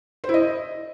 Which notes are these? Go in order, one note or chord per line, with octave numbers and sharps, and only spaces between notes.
C5
E4
D#5